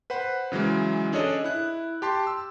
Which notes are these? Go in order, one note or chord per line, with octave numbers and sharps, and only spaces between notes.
B4 C5 F#5 B5
C#3 E3 F#3 G#3
C#4 D4 G#4 A4 C#5 D#5
E4 F#6
G4 A5 C6
E6